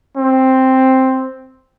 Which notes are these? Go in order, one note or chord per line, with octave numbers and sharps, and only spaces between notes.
C4